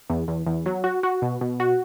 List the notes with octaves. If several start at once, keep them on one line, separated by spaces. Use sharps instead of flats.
E2
E2
E2
F#3
F#4
F#4
B2
B2
F#4